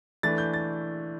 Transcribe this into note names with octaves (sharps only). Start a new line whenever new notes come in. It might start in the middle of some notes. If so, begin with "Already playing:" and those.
E3 A3 D4 A6
G6
A6